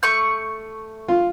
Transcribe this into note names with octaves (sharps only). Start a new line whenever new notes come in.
A3 C#6 G6
F4